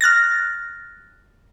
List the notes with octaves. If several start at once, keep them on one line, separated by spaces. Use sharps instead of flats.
F6 F#6 A6 A#6